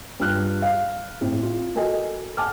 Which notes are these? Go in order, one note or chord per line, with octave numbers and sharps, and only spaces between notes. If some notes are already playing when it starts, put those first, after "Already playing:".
G2 F4 F6 F#6
F5
A2 C4
F4
F#4 A4 A#4 D#5 G#5
F#5 G#5 A5 D6 F6